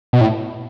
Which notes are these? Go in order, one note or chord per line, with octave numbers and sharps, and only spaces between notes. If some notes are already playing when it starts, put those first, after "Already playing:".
B2
A2